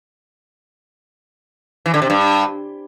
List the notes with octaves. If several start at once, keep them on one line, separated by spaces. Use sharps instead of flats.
E3
D3
C3
G2